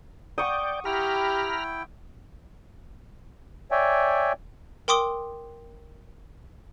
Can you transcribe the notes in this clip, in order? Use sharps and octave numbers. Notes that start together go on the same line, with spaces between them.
D5 F#5 G5 C#6 D#6
E4 G4 G5 A#5 B5 F6
C#5 D5 E5 G5 G#5
A#4 G5 C6 D6 D#6 G7